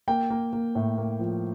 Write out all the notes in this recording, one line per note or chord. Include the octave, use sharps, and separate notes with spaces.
A#3 G5
A#3
A#3
A2
A#3
F3